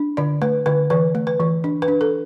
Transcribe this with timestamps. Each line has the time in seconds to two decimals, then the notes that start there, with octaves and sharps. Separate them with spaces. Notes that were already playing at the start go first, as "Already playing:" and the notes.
Already playing: D4
0.17 D3 D5
0.42 A3 B4
0.66 D3 B4
0.90 E3 B4
1.15 A3
1.27 B4
1.40 E3
1.64 D4
1.82 B4
1.88 D4
2.01 A4